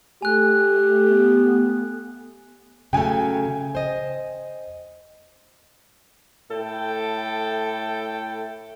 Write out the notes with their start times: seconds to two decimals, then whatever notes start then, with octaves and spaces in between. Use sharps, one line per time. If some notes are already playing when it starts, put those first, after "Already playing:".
0.22 A3 G4 G#5 F#6
1.06 B3
2.93 C#3 F#3 A3 G5 G#5
3.75 C5 D#5
6.51 A2 A4 G5